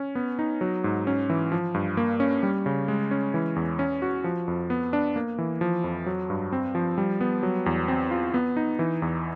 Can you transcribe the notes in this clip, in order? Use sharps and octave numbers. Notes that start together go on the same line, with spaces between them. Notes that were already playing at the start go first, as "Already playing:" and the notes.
Already playing: C#4
B3
D#4
F#3
G#2
C#4
E3
F3
G2
A#3
C#4
G3
C#3
G#3
C#4
E3
E2
C#4
F#4
F3
F2
B3
D4
A#3
E3
F3
F2
F#3
G2
C4
F3
G3
B3
F#3
E2
C4
F4
B3
D#4
E3
E2